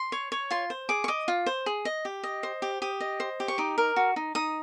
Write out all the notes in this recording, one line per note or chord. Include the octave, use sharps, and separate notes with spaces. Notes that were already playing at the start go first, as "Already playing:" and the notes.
Already playing: C6
C#5
C#5
F4 C6
C5
G#4 D6
C#6
D#5 D6
F4
C5
G#4
D#5
G4
D#5
C5
G4
G4 D#6
D#5
C5
G4
C#6
D#4 D6
A#4
F#4
D#4
D#4 D#6